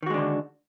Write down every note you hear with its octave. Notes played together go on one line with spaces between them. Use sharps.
D3 D#3 G#3 D4 F#4